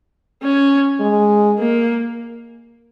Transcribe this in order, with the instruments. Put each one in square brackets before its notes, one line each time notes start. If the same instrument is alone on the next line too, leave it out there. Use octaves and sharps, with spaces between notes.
[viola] C#4
[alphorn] G#3
[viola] A#3